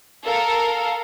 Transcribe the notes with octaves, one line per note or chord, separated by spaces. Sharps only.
A4 A#4 F5